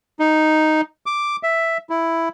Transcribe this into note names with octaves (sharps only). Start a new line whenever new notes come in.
D#4
D6
E5
E4